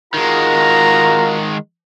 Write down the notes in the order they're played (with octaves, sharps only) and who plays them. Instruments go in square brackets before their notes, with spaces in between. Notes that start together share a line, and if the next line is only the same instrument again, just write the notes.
[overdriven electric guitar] D#3 G#3 [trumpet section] F4 F#4 A#4 [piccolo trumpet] A#5